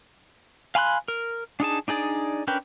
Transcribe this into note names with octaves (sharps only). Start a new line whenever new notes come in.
F5 G#5 B5 C6 F#6
A#4
D4 D#4 G#4 A5
D4 D#4 G#4 D5
C#4 D4 A#4 B4 G5